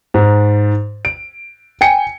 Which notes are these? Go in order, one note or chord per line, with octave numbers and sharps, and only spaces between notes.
G#2
D7
G5 G#5 C#7